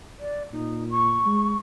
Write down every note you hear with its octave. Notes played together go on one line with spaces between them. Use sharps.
D5
A#2 D#4
C#6
G#3